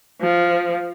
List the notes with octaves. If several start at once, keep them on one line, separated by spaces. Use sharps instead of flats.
F3